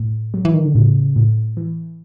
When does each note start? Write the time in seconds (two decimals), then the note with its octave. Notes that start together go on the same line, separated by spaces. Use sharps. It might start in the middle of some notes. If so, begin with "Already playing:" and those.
Already playing: A2
0.34 F#3
0.45 E3
0.54 D#3
0.65 D3
0.74 A2 C#3
1.16 A2
1.57 E3